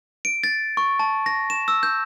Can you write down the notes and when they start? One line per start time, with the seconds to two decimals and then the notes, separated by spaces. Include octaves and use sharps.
0.25 D7
0.44 A6
0.77 C#6
0.99 A5
1.26 A#6
1.50 E7
1.68 E6
1.83 G6